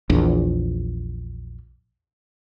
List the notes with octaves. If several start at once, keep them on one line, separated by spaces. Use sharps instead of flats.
A#1 E2